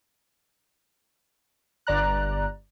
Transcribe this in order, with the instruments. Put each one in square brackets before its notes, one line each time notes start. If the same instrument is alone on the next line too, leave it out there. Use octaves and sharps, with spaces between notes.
[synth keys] G1 D5 A#5 F#6